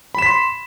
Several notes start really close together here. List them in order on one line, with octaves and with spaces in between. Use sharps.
B5 E7 B6 C6